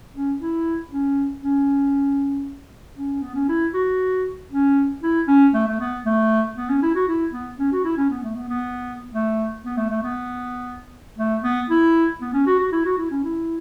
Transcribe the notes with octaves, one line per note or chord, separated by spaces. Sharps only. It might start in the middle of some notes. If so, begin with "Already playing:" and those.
C#4
E4
C#4
C#4
C#4
B3
C#4
E4
F#4
C#4
E4
C#4
A3
A3
B3
A3
B3
C#4
E4
F#4
E4
B3
C#4
F#4
E4
C#4
B3
A3
B3
B3
A3
B3
A3
A3
B3
A3
B3
E4
B3
C#4
F#4
F#4
E4
F#4
E4
C#4
E4